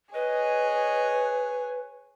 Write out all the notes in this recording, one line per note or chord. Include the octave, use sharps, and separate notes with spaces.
G#4 B4 C#5 D#5